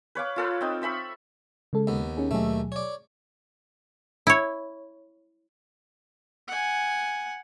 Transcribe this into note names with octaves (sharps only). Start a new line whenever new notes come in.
B4 C#5 F5 D6
F4 A4 B4
C4 D#4
C5 E5 B5 C#6
C#3 G#3 A4
D#2 B3
C#4 D#4 G#4
D#2 B2 F#3 A3 G#4
C#5 D5
E4 C#5
F#5 G#5